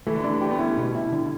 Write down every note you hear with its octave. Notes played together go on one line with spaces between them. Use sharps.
E3 A3
D3
E3 D4
G3
A3 G4
B3
C#4 E4
A3
B2 G3
E4
D3